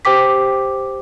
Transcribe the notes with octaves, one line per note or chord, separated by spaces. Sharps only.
G4 C5 G5 D6 B6